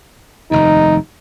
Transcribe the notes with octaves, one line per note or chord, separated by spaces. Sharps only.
F1 D#2 D#4